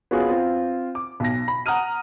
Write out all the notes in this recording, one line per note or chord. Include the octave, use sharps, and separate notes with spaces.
B3 C#4 F4 F#4 G#4
C4 F4
D6
B1 A#6
B5
F#5 A#5 D#6 F6 D#7